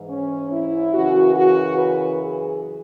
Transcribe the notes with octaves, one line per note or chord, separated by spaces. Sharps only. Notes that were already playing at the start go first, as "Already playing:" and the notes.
Already playing: G#2 E3
C#4
E4
F#2 C#3 E3 F#4
F#4
B4
G#4